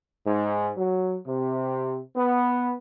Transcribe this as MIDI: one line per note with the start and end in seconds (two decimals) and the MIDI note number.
0.24 0.69 44
0.77 1.16 54
1.26 2.00 48
2.16 2.73 59